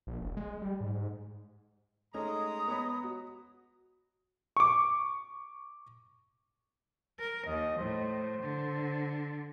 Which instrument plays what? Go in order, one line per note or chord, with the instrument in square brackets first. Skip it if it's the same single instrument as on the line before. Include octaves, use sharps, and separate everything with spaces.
[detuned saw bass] A#1
E1
G#3
G3
G#2
[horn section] G#3 A#5 [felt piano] A3 C#4 D#4 [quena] D#6
[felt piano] B3 C#5 B5
F#4
[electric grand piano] C#6 D6
[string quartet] A#4
[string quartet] D#2 [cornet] D#5
[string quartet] A2 [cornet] C5
[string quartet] D3